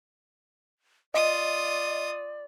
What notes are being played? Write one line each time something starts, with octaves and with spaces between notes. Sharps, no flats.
F4 D5 D#5 D#6